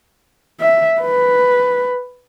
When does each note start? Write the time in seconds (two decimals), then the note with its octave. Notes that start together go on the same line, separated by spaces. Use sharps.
0.60 E5
1.01 B4